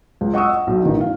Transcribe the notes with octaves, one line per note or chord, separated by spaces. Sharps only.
C#2
D#5 F#5 C#6 D#6 E6
D#5
B1
A1 D#3
F5